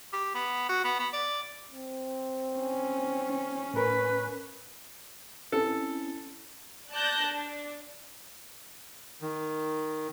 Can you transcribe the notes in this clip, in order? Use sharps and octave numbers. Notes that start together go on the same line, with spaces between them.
G4
B3
F#4
B3
B3
D5
C4
C#4
A2 A#4 B4
C4 C#4 E4 A4
D5 A5 F#6 G6 A#6
D4
D#3